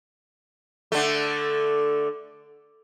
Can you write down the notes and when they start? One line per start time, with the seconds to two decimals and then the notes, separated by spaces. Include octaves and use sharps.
0.92 D3 A3